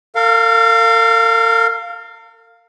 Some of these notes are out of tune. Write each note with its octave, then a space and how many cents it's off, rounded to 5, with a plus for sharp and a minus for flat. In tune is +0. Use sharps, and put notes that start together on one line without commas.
A#4 -45 F5 +0